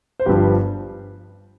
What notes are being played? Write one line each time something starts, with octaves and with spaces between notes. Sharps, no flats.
C5
G1 G2 F3 G4 B4